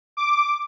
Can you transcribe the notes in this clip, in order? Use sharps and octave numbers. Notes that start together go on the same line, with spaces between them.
D6